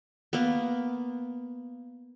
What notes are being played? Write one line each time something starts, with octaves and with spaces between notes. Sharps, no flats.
A#3 B3